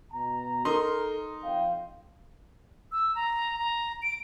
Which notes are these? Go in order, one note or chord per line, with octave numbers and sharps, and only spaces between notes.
B2 A#5
D#4 A4 A#4 C6
F2 F5 G5
E6
A#5
A#5
D7